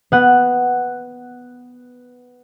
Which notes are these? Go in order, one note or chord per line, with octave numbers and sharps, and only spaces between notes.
B3 F#5